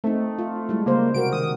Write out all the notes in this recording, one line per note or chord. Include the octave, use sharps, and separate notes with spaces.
A3 C4 D#4
F4
G3 G#3 E4
C#3 G3 A#3 C5
C3 F#4 A#4 D7
D#3 D#6